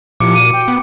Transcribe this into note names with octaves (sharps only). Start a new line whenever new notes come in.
A#2 F3 E4 G4 D6 C#7 D7
F#4 D#7
G5
B3